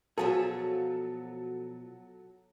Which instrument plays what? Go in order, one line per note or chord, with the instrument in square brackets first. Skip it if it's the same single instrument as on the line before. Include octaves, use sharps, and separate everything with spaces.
[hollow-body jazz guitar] B2 F3 G#4 [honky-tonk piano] F#3 A4